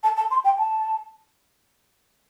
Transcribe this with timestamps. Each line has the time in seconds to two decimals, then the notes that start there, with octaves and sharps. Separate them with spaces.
0.03 A5
0.17 A5
0.31 C6
0.44 G5
0.58 A5